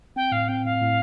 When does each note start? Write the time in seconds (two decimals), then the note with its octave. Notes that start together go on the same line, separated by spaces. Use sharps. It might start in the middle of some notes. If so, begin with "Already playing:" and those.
0.16 C4 G5
0.32 A2 F5
0.48 C4 G5
0.65 A2 F5
0.81 A2